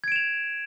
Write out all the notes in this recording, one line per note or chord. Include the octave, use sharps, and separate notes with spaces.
G#6 D7 E7 F7